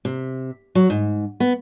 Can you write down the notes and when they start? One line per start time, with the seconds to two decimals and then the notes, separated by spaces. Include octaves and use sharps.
0.05 C3
0.75 F#3
0.90 G#2
1.40 B3